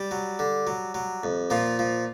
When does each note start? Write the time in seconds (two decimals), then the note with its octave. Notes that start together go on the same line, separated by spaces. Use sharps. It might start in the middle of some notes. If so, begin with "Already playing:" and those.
Already playing: G3 G4
0.11 F#3
0.39 D3
0.67 F#3
0.95 F#3
1.24 F2
1.50 A#2 F3 F4
1.79 F3